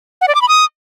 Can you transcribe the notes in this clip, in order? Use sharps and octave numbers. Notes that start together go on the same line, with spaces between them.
F#5
D5
D6
B5
D#6